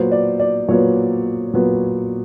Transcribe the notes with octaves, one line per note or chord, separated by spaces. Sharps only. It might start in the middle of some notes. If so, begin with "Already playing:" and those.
Already playing: A#2 F#3 B3 C5
D5
D5
A#2 F#3 B3 C#5
A#2 F#3 B3